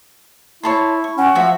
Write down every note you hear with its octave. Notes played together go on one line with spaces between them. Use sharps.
E4 C#5 A5 C6
C#6
C#4 F#5
F3 F#4 E5